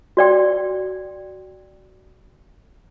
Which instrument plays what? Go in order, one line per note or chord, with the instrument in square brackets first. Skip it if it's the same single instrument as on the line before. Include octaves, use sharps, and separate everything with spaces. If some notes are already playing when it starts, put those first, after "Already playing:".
[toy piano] F#4 D5 G5